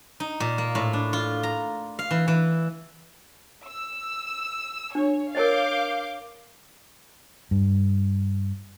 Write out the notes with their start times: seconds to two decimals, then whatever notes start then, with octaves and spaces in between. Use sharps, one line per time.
0.20 D#4
0.40 A#2
0.58 A#3
0.75 A2
0.93 D4
1.13 F4
1.43 A#5
1.99 F5
2.11 E3
2.28 E3
3.65 E6
4.95 D4 C#5
5.35 A#4 C#5 D#5 F5 D6 G6
7.51 G2